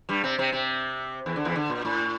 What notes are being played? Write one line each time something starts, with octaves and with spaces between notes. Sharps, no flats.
G2 G3
C3 C4
C3 C4
C3 C4
E2 E3
D3
E2 E3
D3
A#2
A2